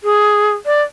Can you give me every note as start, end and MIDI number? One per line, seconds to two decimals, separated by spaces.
0.04 0.51 68
0.66 0.82 74